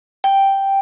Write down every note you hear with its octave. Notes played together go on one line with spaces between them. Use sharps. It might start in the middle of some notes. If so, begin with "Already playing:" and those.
G5